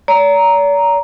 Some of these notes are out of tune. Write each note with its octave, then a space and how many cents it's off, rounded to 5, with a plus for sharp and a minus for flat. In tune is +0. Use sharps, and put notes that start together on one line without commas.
D5 -45 A#5 +0